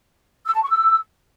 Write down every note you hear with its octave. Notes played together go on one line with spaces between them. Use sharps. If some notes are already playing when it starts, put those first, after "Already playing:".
E6
A5
C#6
E6